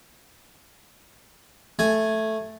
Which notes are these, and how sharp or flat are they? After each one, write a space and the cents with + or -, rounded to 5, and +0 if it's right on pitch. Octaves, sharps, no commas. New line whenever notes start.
A3 +0 G#5 +0